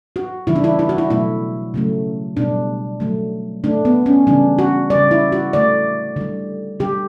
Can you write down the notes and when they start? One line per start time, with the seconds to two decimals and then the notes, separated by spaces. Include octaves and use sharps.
0.16 F#4
0.47 C#3 E3 G3 E4
0.56 D4
0.64 E4
0.79 E4
0.89 F#4
0.98 E4
1.10 B2 F#3 A3 E4
1.74 C#3 F#3 A3
2.37 B2 G3 D4
3.00 D3 F#3 A3
3.64 D3 A3 D4
3.85 B3
4.06 C#4
4.27 C#3 E3 G3 D4
4.59 F#4
4.90 C#3 G3 D5
5.11 E4
5.32 F#4
5.53 D3 A3 D5
6.16 D3 G3
6.80 D3 G3 G4